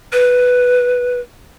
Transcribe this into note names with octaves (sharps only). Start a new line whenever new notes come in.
B4